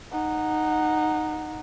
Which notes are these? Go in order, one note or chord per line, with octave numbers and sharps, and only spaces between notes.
D#4 F#5